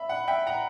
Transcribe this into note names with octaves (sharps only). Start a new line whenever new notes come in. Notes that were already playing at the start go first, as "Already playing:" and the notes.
Already playing: E5 B5
F#5
E5 G5
F#5 A#5